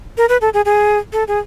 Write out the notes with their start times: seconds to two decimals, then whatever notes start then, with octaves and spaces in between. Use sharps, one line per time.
0.17 A#4
0.29 B4
0.41 A4
0.54 G#4
0.65 G#4
1.13 A4
1.28 G#4